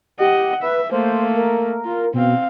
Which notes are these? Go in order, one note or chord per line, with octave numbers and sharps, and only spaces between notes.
G4 D#5 F#5
B4 E5
A3 A#3 C5
A#4
F4
B2 C4 F5